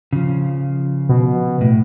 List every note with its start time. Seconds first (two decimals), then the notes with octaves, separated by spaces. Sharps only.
0.13 C#3 F3
1.09 B2
1.61 A2